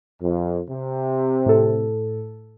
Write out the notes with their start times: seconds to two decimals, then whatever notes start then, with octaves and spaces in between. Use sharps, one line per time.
0.21 F2
0.68 C3
1.46 A2 A4